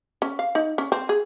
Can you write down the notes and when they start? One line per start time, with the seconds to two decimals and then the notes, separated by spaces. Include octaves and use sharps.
0.22 C#4
0.39 F5
0.55 D#4
0.78 C#4
0.92 C4
1.09 G#4